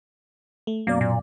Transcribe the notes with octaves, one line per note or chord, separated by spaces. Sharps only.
A3
F#2 B2 A#3 D5
A#2